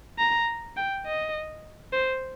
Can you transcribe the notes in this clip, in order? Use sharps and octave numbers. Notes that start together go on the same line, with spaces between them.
A#5
G5
D#5
C5